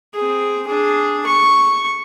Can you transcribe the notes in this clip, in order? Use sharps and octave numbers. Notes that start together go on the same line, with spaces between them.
C4 G#4
D4 G#4
C#6